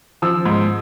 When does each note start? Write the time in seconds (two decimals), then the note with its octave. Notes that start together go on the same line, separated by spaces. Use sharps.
0.22 F3 E6
0.46 G#2